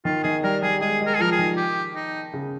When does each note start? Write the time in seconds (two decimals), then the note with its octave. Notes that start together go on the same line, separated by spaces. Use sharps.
0.05 D#3 F4
0.24 D#3 G#4
0.43 G3 A#4
0.62 G3 G#4
0.81 G#3 G#4
1.00 G#3
1.07 A#4
1.15 G#4
1.20 F3 A#4
1.32 G#4
1.39 D#3
1.57 G4
1.96 D#4
2.33 C#3